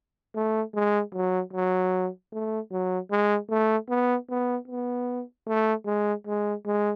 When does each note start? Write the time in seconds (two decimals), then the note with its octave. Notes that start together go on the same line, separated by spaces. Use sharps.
0.35 A3
0.74 G#3
1.14 F#3
1.53 F#3
2.32 A3
2.72 F#3
3.11 G#3
3.50 A3
3.89 B3
4.30 B3
4.68 B3
5.47 A3
5.86 G#3
6.27 G#3
6.66 G#3